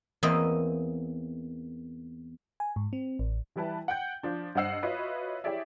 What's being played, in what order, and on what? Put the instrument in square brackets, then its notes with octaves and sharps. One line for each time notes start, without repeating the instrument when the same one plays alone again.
[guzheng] E2 A#3 C4 D#5 E5
[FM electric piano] G#5
G#2
C4
A1
[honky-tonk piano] E3 G3 E4 B4 A5
F#5 G5 G6
F3 D4
G2 C5 D#5 F#5 E6 C7
F4 F#4 B4 C#5 D#5 E5
E4 G4 G#4 C#5 D5 E5